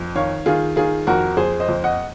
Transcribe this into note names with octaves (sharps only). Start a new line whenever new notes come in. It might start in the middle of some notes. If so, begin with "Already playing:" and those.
Already playing: F2
D#3 C#5 F5
D#3 F4 G#4
D#3 F4 G#4
F2 F#4 A#4
F2 G#4 C5
C5 D#5
F2
D#5 F#5